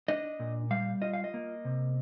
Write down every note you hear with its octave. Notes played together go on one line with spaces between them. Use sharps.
D4 D#5
A#2
G3 F5
F4 D#5
F5
D#5
A#3
C3